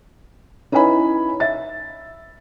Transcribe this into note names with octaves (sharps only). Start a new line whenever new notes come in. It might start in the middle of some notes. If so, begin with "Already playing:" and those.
C#4 D#4 E4 B4 G#5 B5
E5 A6